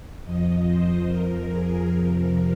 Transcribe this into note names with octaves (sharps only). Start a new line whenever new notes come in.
F2 F3 D#5
C5
F2 F3 A#4
G#4
F2 C3 F3 A#4